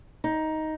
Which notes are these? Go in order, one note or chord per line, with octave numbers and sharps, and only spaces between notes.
D#4